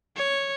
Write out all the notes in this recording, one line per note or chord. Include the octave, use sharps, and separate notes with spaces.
C#5